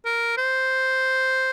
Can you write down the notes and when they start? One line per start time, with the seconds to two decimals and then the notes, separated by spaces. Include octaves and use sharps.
0.05 A#4
0.37 C5